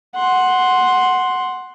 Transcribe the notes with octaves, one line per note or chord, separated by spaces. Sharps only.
F#5 C6